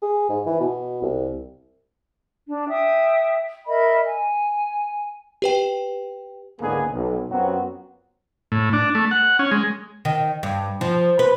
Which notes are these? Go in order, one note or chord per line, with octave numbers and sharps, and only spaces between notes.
G#4
G#2
E3
B2
C2
D4
E5 G5 D#6
A#4 D#5 E5 B5
G#5
G4 B4 G5
C#2 G#2 D3 A#3 B3 G#4
B1
F#2 F#3 B3 C4 F4 F#4
A2
D4
A3
F#5
C#4
G#3
D#3
G2
F3
B4